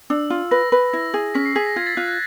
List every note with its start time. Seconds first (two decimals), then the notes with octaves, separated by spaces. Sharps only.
0.10 D4 E6
0.30 F4
0.51 B4 A#6
0.72 B4
0.93 E4 A#6
1.14 G#4
1.34 C#4 B6
1.45 C7
1.56 G#4 B6
1.67 A#6
1.76 F4 G#6
1.87 A6
1.97 F4 F#6
2.08 F#6